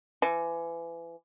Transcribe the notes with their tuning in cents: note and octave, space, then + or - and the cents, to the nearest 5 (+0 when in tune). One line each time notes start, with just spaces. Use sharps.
E3 +30